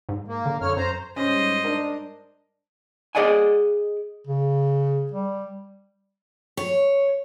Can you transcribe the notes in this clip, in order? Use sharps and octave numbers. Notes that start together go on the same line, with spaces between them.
G#2
A#3
D3
F#2 D3 C#5 F6
F#2 C5 A#5
G#2 G3 C#4 C5 D#5
D4 A#4 D#6
G#4 D5 D#5 F#5 G#5
C#3
G3
C#5